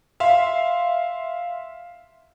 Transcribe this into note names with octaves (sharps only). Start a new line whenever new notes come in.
E5 F5 C6